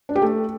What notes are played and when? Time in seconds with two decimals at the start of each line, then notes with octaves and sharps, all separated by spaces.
0.09 D4
0.16 G4
0.22 A3